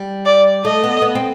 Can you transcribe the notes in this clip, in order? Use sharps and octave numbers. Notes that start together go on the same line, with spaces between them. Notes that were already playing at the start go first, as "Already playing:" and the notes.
Already playing: G3
D5
A3 D#5
B3
B3
C4